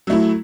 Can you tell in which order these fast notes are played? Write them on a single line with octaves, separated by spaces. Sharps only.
F#3 A3 E4